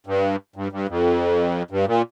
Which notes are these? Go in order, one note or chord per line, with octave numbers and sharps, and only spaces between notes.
G2
G2
G2
F2
G2
A#2